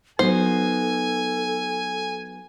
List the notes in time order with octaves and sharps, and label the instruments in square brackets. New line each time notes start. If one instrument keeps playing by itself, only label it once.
[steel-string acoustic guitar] F#3 B3 D#4 [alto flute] A4 [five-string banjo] C5 [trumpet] G#5